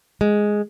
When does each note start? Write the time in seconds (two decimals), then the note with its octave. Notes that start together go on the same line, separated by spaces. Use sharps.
0.21 G#3